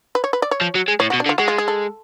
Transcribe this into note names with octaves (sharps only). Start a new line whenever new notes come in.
B4
C#5
B4
D5
C#5
F3
F#3
G#3
A2 C#5
B2 F#4
D4
D3
F4
G#3 F#4
F4
G#4
A4